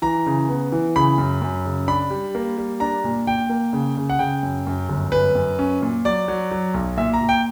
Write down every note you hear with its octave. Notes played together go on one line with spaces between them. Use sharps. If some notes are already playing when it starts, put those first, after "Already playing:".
E3 A#5
C#3
B3
E3
C#3 B5
F#2
F#2
C#3
D4 B5
G3
A#3
G3
D4 A#5
A#2
A#2 G5
A#3
C#3
C#3
F#5
C#3 G5
F#2
F#2
G1
F#2 B4
F#2
C#4
A#2
F#3 D5
F#3
F#3
B1
A#2 E5
A#5
A#2
G5